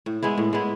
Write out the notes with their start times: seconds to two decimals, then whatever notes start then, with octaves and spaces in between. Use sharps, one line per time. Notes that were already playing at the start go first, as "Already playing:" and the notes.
0.06 A2
0.23 G#3 B3 E4
0.38 A2
0.53 G#3 B3 E4